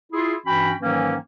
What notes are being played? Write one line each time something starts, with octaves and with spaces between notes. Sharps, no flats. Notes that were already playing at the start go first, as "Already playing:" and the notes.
E4 F4 G#4
G2 E3 C#4 F#4 G5 B5
G#2 D#3 E3 F#3 A#3 C#4